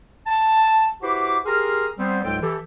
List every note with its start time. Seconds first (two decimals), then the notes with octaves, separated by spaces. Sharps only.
0.27 A5
1.02 E4 F#4 G4 B4 C5 D6
1.46 G4 G#4 A#4 A#5 C6 F6
1.98 G3 B3 C4 C5
2.24 C#2 G#2 F#3 G#3 A4 G5
2.41 E3 G4 A4